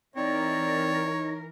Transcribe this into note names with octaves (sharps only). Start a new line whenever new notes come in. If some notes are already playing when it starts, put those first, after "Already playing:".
E3 C4 D#4 A#4 C#5 D5